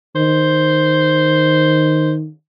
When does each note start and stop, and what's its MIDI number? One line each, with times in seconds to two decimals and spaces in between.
0.16 2.29 51
0.16 2.13 72